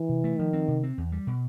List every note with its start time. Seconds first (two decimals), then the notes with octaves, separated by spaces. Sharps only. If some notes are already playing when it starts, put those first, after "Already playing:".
Already playing: E3
0.09 C3
0.24 A3
0.38 D#3 F3
0.53 C4
0.68 C3
0.83 C4
0.98 E2
1.12 G3
1.27 B2